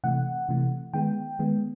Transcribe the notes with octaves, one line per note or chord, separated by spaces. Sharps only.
C3 E3 A3 F#5
C3 E3 A3
D#3 G#3 B3 G5
D#3 G#3 B3